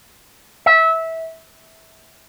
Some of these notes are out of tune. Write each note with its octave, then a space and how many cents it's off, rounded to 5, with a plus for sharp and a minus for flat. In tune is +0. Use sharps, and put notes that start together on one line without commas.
E5 -20